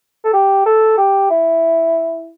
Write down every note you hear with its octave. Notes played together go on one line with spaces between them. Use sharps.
A4
G4
A4
G4
E4